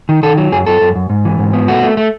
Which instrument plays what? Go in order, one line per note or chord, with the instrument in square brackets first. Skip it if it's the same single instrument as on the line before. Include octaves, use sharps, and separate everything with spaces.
[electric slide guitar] D#3
D#3 A4
F#3
F#2 G#4
F#2 A4
F#2
F#2
G#2
E3
G#2
B3
A3 F#4
A3
A3